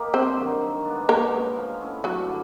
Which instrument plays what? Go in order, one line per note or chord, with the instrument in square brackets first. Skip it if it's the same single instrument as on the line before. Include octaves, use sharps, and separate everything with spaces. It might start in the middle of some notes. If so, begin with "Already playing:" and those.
Already playing: [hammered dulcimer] A#3 D#4 G4
[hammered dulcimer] G2 [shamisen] C4 C5
[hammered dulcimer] D#3 F#3
D#3
G#3 B3 D4
[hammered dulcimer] B2 [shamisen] A#3 A#4
[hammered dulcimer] G#3 C#4
F3
A3 C#4 E4
[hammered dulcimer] G2 [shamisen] F#3 F#4
[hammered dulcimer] D3